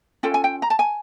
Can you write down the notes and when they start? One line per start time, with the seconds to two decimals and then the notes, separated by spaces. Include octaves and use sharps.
0.23 C#4 F4 A4 G5
0.34 G#5
0.44 G5
0.62 A#5
0.70 A5
0.79 G#5